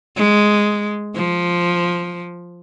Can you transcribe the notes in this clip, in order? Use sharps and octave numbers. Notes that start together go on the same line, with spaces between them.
G#3
F3